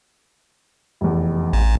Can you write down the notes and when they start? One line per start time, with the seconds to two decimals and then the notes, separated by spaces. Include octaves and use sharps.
1.01 F1 E2
1.53 A1